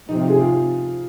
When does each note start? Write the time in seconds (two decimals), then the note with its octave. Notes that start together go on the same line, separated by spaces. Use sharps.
0.08 C3 F3 C4 D#4
0.19 F4
0.30 G#4
0.41 F4
0.53 F3